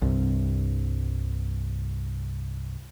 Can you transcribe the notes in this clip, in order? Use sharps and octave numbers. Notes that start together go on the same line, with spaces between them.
C2 G2 C3